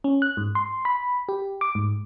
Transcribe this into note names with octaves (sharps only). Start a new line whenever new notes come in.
C#4
F#6
G#2
C6
B5
G4
D6
G#2